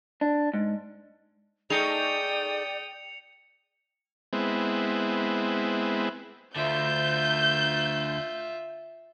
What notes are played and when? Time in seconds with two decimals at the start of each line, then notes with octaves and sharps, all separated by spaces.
0.21 D4
0.54 G#2
1.70 A3 D#4 G#4 D5 G5 D#6 C#7 F7
4.33 G#3 B3 C4 E4
6.56 D2 D3 F4 E5 G6